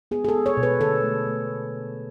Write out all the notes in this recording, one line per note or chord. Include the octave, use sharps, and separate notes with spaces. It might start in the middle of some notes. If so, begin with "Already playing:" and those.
B3 G#4
G#4
A4
B3
C#5
B2
B4
D3 A4
A3
A3